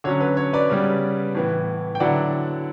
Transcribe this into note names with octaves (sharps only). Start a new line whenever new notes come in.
D3 F#3 C#4 C#5
B4
C#5
B4 D5
C#3 G3 B3
A2 E3 B3
G5
D3 F#3 B3 E4 D5 F#5